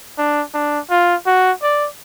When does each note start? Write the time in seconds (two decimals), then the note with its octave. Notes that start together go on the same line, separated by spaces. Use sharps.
0.18 D4
0.54 D4
0.90 F4
1.27 F#4
1.63 D5